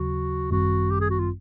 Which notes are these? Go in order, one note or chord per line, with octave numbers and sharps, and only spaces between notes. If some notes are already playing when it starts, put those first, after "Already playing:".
Already playing: D#2 C#3 F#3 F#4
G#1 F#2 D#3 G3 C4 F#4
G4
G#4
F#4
F4